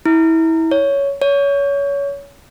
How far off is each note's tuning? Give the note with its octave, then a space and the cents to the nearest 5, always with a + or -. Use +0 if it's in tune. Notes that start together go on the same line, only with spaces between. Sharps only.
E4 -25
C#5 +10
C#5 +25